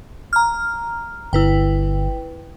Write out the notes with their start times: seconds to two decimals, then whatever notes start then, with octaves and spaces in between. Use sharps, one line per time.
0.33 A#5 F6
1.33 G1 E4 B4 G5